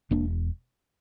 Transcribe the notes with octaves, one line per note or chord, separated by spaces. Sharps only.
E1 A#3 D4